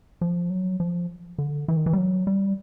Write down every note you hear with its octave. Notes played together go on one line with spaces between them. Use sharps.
F3
F#3
F3
D3
E3
D#3
E3
G3
F#3
G3